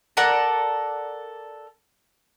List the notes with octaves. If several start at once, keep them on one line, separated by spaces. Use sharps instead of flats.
A4 A#4 D5 F#5